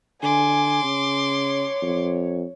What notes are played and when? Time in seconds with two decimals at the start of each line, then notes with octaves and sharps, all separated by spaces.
0.23 D3 G#5 C6 D6
0.84 C#3 C#5
1.82 F2